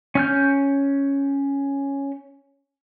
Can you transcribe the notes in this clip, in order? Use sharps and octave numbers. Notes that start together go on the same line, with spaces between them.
C#4 F6 G6